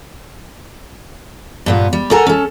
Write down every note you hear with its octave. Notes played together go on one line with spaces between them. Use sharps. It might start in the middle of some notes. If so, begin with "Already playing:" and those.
G2 A#2 B3
G3
A4 A#4 F#5 G#5 A#5
C#4 A4